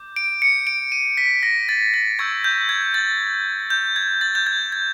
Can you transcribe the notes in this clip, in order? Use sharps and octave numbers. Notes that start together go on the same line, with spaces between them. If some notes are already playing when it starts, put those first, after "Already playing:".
Already playing: D6 G6
D7
C#7
D7
D#7
B6
A#6
A6
A6
C#6 E6 G6 G#6
G6
G#6
A6
G6
G#6
A6
G6
G#6
G#6